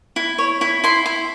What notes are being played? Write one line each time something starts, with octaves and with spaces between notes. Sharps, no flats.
E4
C#5
E4
E4 C6
E4